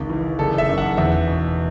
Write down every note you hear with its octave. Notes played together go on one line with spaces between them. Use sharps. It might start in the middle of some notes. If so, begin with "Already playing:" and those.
Already playing: G#1 C#2
E3
F#1 A4
E5
F#2
F#5
E2 E5
B2